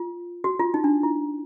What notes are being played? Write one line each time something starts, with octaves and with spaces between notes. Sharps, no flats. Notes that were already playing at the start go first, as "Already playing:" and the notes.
Already playing: F4
F#4
F4
D#4
D4
E4